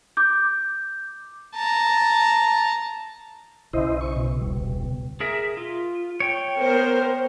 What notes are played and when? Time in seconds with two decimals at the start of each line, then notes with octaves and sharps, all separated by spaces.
0.17 D6 G6
1.55 A5 A#5
3.73 B1 C#3 E4 C5 D#5
4.01 C#6
4.16 B2
4.41 E1 C#2 G3
5.20 G#4 A#4 E5
5.57 F4
6.20 C#5 G5
6.57 B3 A#4 C5